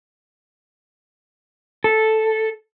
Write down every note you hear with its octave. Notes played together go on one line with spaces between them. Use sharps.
A4